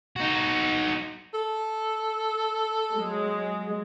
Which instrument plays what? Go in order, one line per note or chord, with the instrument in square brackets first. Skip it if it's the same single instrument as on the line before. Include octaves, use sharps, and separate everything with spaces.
[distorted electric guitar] D#4 F#4
[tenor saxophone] A4
[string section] F#3 G#3